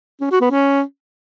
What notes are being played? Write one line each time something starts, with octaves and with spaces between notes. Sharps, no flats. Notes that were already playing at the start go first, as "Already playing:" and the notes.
C#4
F#4
B3
C#4